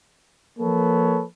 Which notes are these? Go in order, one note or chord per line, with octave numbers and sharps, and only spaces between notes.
F3 A#3 A4 B4 C#5